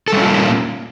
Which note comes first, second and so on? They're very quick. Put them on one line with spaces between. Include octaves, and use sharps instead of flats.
A4 G3 C#4 F4 A#3